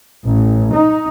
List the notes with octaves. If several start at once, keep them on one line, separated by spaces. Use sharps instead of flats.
A1
D#4